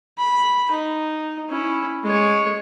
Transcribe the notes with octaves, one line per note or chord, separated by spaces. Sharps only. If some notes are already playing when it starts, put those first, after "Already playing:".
B5
D#4
C#4 E4
G#3 C#5